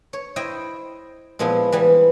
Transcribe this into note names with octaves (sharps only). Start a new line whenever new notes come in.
C#5
E4 C5 D#5 G5
A#2 F3 G#3 B3 E4
E3 G3 B3